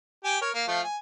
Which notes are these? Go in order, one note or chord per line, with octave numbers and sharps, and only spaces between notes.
G4 G5 G#5
A#4 C#5
A#3
F3 A3 F4
G#5